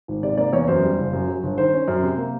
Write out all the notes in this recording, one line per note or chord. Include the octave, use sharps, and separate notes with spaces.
G#1
C3 D5
A#3 D5
E2 C#5
F#2 C5
G3
F#1
F#2
F#3
G1
D#3 C5
C#4
F#2
C3
A#3